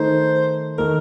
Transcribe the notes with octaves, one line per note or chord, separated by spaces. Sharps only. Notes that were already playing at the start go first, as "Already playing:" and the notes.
Already playing: D#3 A3 D#4 C5
D#3 A3 D#4 A#4